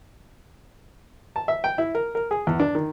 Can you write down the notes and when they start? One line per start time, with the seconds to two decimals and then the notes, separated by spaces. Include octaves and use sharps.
1.36 A5
1.48 E5
1.64 G5
1.78 E4
1.95 A#4
2.15 A#4
2.31 G#4
2.47 E2
2.60 D4
2.75 D#3